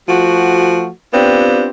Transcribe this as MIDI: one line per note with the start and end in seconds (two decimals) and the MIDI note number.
0.08 0.88 53
0.08 0.88 57
0.08 0.88 66
1.13 1.70 59
1.13 1.70 60
1.13 1.70 62
1.13 1.70 65
1.13 1.70 67